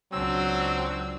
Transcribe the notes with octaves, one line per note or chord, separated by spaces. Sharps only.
C#2 F#3 C4 D4 E6